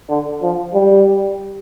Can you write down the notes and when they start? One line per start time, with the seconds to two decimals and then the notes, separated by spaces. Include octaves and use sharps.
0.09 D3
0.42 F3
0.73 G3